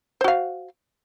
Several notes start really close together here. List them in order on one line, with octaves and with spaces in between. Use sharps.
C5 F#4 F5